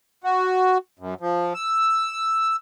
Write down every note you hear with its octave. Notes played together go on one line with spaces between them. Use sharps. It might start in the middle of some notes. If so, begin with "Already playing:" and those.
F#4
F#2
F3
E6